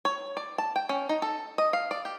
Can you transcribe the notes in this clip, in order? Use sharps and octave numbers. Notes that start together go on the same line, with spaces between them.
C#5
D5
A5
G5
C#4
D#4
A4
D#5
F5
D5
G4